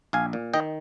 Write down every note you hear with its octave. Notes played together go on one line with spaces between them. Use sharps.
A#1 F5 G#5
A#2
D#3 D#5 G5